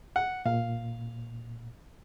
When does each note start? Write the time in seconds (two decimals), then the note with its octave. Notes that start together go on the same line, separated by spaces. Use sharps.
0.16 F#5
0.46 A#2 F5